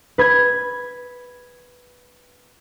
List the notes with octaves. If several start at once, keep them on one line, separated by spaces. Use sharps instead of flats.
B4 G#6